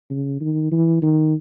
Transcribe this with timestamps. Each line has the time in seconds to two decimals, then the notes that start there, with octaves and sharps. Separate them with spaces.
0.11 C#3
0.41 D#3
0.72 E3
1.02 D#3